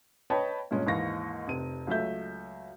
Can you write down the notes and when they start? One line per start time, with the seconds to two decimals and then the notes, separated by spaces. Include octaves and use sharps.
0.30 B4 C#5 D#5 G5 A5 B5
0.71 G2 A#2 G#3 C#4
0.86 D#2 G#2 E3 F5 C#6 A#6
1.48 F1 C3 D#7
1.87 C#2 F#3 A3 E5 G6